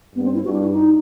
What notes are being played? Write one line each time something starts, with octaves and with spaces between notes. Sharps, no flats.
G2 B3
C4
E4
G2 F#4
G4
E4
D#4